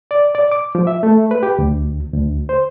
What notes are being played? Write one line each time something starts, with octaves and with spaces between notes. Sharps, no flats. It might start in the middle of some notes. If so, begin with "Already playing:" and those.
D5
D5
D6
F3
E5
A3
B4
G4
D2
D2
C5